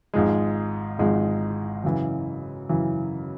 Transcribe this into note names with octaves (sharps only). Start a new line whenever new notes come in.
G#1 G#2 F3 G#3
G#1 G#2 F3 G#3
F#2 C#3 E3
F#2 C#3 E3